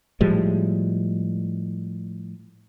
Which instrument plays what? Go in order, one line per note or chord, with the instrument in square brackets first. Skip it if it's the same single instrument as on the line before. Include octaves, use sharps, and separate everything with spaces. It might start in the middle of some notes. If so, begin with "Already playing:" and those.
[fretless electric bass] A2 F3 G3 G#3